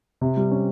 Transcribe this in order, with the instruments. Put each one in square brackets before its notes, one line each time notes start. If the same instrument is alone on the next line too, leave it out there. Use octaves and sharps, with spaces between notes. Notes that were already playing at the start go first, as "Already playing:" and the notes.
[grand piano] C3
G3
C#4